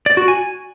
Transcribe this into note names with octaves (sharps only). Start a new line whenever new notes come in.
D5
F#4
G#5